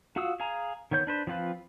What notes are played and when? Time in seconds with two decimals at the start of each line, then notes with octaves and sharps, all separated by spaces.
0.16 F4 F#4 F5 D#6 E6
0.40 G#4 F5 G#5 A#5
0.91 D#3 B3 C#5 G6
1.07 D4 B4 C5
1.27 F3 C4 F4 B4